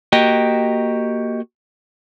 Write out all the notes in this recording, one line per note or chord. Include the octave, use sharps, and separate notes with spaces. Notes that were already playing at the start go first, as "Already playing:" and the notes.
A#3 F#4 G4 D#5 G5